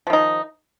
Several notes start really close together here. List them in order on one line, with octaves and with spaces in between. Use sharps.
F3 D#3 D#4